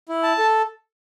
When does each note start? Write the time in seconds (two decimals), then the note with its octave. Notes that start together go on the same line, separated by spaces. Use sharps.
0.09 E4
0.23 A5
0.38 A4